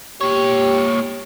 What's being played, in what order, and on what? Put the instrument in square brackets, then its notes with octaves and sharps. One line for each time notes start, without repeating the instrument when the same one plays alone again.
[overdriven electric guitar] A#2 C#5 [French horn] G4